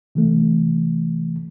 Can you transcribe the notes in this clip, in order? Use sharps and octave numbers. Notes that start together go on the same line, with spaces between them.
C3 E3 A3